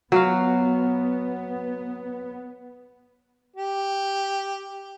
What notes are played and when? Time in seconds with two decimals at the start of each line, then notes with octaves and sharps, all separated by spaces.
0.12 F#3 B3 F#4 F5
3.56 G4